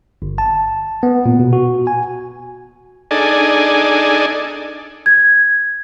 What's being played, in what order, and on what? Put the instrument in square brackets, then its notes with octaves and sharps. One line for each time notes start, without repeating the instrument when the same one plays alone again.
[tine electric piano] G1
A5
B3
A#2
B2
F#4
G#5
[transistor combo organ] D4 D#4 G#4 A4 D5 G#5
[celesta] G#6